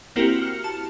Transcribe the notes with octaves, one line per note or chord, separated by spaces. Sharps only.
A#3 C4 E4 F#4 G4 A#4
F6 C#7
A5 E7